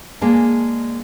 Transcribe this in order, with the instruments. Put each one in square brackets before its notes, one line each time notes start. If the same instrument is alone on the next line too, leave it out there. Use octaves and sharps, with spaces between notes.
[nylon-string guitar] G#3 A#3 D4